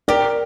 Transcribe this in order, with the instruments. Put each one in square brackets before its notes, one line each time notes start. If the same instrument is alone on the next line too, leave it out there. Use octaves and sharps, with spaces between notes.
[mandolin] G4 [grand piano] A#4 D5